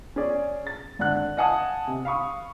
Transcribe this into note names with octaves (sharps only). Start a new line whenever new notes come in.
C#4 G#4 D5
A6
G#1 D3 D5 F#5 F#6
D#5 F5 F#5 G#5 A5 D#6
C3
F5 B5 C#6 D#6